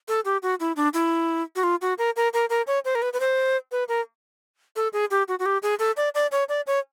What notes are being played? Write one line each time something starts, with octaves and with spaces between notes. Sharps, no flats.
A4
G4
F#4
E4
D4
E4
F#4
F4
F#4
A#4
A#4
A#4
A#4
C#5
C5
A#4
B4
B4
C5
B4
A#4
A4
G#4
G4
F#4
F#4
G4
G#4
A4
D5
D5
C#5
D5
C#5